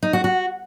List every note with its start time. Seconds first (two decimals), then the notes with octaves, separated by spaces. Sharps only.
0.03 D#4
0.13 F#4
0.24 F#4